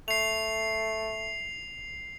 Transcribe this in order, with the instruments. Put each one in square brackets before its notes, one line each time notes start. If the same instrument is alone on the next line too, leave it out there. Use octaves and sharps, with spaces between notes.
[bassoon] A3 [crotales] C7 F7